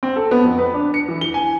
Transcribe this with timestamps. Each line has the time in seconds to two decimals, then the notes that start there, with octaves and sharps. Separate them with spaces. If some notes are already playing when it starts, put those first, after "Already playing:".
0.03 C4
0.16 A4
0.31 B3
0.44 F2
0.58 B4
0.74 D4
0.94 C#7
1.08 E3
1.21 G7
1.34 G#5